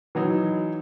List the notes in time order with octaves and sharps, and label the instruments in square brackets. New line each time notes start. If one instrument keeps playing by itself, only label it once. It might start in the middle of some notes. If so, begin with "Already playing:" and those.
[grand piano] E3 F#3 D#4